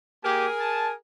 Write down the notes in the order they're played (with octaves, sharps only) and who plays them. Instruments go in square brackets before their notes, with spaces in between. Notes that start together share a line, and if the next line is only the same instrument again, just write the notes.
[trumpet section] A#3 G4 [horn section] G#4 A#4 G#5
[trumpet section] A5